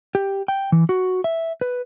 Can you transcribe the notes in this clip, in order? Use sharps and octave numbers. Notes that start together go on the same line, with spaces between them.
G4
G5
E3
F#4
E5
B4